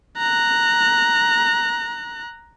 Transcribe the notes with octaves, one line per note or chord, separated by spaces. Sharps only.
A#5 F#6